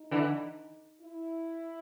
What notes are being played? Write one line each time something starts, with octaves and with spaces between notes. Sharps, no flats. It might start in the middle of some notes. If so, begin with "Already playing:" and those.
Already playing: D#4
D3 E3
E4